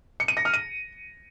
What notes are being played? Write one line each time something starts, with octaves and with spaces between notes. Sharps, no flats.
C#7
D#7
A#6
F6
D#7